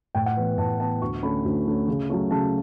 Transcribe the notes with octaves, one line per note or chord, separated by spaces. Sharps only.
A2 G5
F#5
E3 B3
A2 A5
E3 B3 A5
D2 C#6
D3 A3 C#4 B5
D2
D3 A3 C#4
C#3
F#3 A3 C#4
C#3 A5